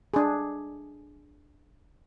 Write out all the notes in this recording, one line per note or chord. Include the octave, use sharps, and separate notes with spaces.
D4 G#4